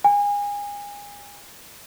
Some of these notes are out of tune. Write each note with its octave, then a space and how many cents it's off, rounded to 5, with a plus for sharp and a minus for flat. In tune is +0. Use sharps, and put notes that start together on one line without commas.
G#5 -30